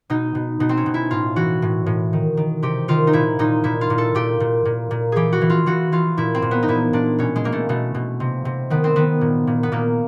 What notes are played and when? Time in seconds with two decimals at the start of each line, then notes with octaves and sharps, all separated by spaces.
0.10 B2 D#4
0.35 B2
0.60 B2 D#4
0.69 C4
0.77 C#4
0.86 B2
0.94 E4
1.11 A2 F4
1.36 E3 F#4
1.62 A2
1.86 A2
2.13 D#3
2.37 D#3
2.63 C3 G4
2.88 D#3 F4
3.07 D#4
3.13 A#2 E4
3.39 A#2 D#4
3.64 A#2 E4
3.81 F4
3.90 A#2
3.98 A4
4.15 A#2 G4
4.40 A#2
4.65 A#2
4.91 A#2
5.12 E3 G4 G#4
5.33 F#4
5.41 E3
5.50 F4
5.66 E3 F#4
5.92 E3 F4
6.17 A#2 E4
6.35 C4
6.42 A#2
6.51 B3
6.63 D#4
6.68 A#2 E4
6.93 A#2 D4
7.18 B2 C#4
7.36 G#3
7.44 B2 A#3
7.52 A3
7.69 B2 A3
7.95 B2
8.20 C3
8.45 C3
8.70 D#3 B3
8.84 C4
8.96 D#3 B3
9.21 A#2
9.47 A#2
9.63 B3
9.72 A#2 A#3